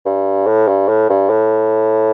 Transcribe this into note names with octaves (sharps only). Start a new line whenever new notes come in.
G2
A2
G2
A2
G2
A2